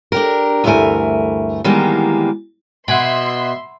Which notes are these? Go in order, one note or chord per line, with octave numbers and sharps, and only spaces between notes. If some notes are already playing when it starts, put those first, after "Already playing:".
D4 G4 A#4
D2 G2 E3 A3 A#4 G#5
D#3 E3 G3 G#3 A#3 B3
B2 E5 F#5 G#5 B5 C6